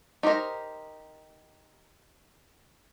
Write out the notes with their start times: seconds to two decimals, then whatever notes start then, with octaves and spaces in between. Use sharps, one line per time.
0.23 D#4 G4 A#4 C5 A#5